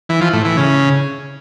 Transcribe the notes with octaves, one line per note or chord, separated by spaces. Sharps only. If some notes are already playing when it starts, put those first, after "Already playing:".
E3
F3
A2
E3
C#3